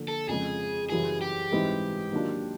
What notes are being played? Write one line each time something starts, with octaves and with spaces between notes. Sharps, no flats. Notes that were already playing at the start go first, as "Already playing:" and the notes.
Already playing: D3 F3 A#3
A4
F2 C#3 F3 G#3 G#4
F#2 C#3 E3 G3 G#4
G4
G#2 E3 G3 C4 D#4
D#3 F#3 A#3 D4 F4